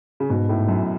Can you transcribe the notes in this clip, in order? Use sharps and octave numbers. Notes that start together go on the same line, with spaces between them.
C#3
G#2 B2
A2
F#2